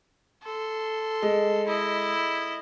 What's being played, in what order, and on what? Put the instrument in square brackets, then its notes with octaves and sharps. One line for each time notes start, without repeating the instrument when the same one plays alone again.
[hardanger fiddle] A4 C6
[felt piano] G#3
[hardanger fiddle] E4 D#5